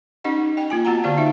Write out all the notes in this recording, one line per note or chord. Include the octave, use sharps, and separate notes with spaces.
C#4 D#4 G4 D#5 F#5
D#5 G5
A#3 F4 G#5
B3 F#4 F#5 A#5
D3 B3 G4 D5 F5
D#4 E5